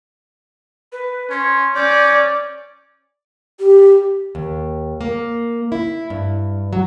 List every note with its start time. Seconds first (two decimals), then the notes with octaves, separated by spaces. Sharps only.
0.92 B4
1.30 C#4 C6
1.75 C#4 D5 G6
3.60 G4
4.35 D#2
5.01 A#3
5.72 E4
6.10 G2
6.73 F#3